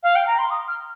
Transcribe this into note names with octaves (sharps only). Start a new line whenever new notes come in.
F5
G5
A#5
C6
D#6
F6